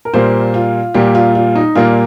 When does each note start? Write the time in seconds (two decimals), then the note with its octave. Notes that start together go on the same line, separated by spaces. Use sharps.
0.05 A#4
0.14 A#2 G3 A#3 C5
0.54 F4
0.94 A#2 G3 A#3 G4
1.15 F4
1.35 F4
1.55 D#4
1.75 A#2 G3 A#3 F4